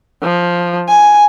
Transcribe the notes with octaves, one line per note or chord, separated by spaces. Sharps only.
F3
G#5